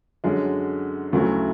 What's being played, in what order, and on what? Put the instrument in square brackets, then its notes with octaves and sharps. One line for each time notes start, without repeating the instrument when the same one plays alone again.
[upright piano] F#2 D3 G#3
D2 C#3 F#3 A3 E4